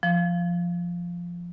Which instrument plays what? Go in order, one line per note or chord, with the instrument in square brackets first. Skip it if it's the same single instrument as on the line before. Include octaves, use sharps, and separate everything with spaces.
[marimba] F3